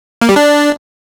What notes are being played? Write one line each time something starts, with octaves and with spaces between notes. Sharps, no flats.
A#3
G3
D4